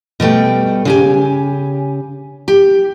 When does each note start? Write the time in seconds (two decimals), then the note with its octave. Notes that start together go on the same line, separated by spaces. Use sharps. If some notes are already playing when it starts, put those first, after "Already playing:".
0.20 B2 G3 A3 G5
0.85 C#3 G4 G#5
2.48 G4